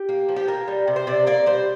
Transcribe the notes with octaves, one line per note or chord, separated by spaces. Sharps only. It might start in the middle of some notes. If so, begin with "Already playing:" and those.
Already playing: G4
A#3
F3
G4
A#3 A#4
G3
C3
C5
C3 D5
A#3 D5
G3 C5